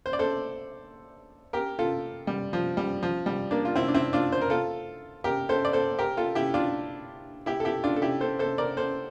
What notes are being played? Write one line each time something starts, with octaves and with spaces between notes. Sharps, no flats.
C5
D5
A4 C5
G4 A#4
F4 A4
G3
F3
G3
F3
G3
A#3 D4
F4
C4 E4
D4
C4 E4
D4 F4
C5
A#4
F4 A4
G4 A#4
A4 C5
D5
A4 C5
G4 A#4
F4 A4
E4 G4
D4 F4
E4 G4
A4
E4 G4
D4 F4
A4
E4 G4
A4 C5
A4 C5
A#4 D5
A4 C5